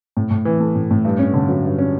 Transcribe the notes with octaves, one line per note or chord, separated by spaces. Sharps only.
A2
A2
E3
A3
A2
A2
G2
C#4
D3
F#3
G2
C#4